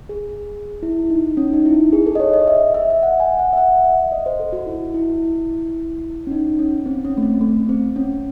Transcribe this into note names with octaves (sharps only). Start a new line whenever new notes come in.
G#4
E4
D#4
C#4
D#4
E4
G#4
A4
D#5
C#5
D#5
E5
E5
E5
F#5
G#5
F#5
E5
F#5
E5
D#5
C5
A4
F#4
E4
E4
C#4
D#4
C#4
C4
C#4
A3
C4
A3
C4
C#4